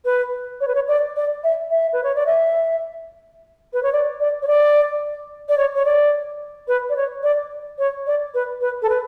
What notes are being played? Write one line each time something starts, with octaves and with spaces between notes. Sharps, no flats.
B4
C#5
B4
C#5
D5
D5
E5
E5
B4
C#5
D5
E5
B4
C#5
D5
D5
C#5
D5
D5
C#5
C#5
D5
B4
D5
C#5
D5
C#5
D5
B4
B4
A4
B4